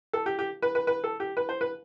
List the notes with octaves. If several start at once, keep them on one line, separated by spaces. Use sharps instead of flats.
A4
G4
G4
B4
B4
B4
A4
G4
B4
C5
B4